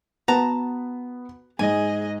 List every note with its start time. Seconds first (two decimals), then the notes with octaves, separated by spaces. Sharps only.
0.28 B3 F#4 B4 A5 A#5
1.59 G#2 G#4 D#5 G#5